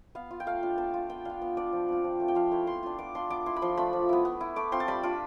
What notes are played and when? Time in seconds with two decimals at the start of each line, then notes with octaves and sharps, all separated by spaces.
0.15 B3 F5
0.31 F4
0.40 G5
0.47 A3 F5
0.63 D4 F4
0.78 B3 A5
0.94 F4
1.10 B3 G5
1.25 D4 F4 F5
1.42 B3
1.57 D4 F4 D5
1.72 F3
1.88 C4 F4
2.04 F3
2.20 A3 C4
2.28 G5
2.35 F3 F5
2.51 A3 E4
2.67 B3 C6
2.83 D4 F4
2.99 B3 D6
3.15 D4 F4 C6
3.30 B3 D6
3.46 E4 C6
3.56 B5
3.62 F3 C6
3.77 A3 D4 F4 B5
3.93 F3
4.09 B3 E4
4.25 B3
4.41 E4
4.56 A3 D6
4.72 C4 F4 C6
4.80 A5
4.88 G3 B5
5.03 D4 F4 D6